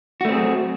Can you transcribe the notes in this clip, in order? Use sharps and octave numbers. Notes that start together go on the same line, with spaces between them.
F#3 A3 C4 F#4 G#4